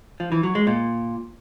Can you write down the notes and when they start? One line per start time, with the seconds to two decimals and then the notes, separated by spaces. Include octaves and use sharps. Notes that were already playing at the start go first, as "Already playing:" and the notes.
0.20 F3
0.32 E3
0.43 F#3
0.55 G#3
0.67 A#2